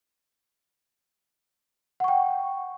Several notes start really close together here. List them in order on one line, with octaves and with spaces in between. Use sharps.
F#5 C#6 G5